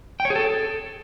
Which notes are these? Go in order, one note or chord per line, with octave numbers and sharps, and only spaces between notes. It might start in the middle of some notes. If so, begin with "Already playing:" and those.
G5
C#5
G#4
A4